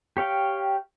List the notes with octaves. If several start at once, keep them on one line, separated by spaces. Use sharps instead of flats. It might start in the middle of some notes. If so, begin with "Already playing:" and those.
G4 C#5 F5 G5